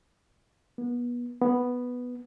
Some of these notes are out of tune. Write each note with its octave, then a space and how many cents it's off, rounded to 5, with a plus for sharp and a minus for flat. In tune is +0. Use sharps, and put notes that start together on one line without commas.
B3 -30
B3 +0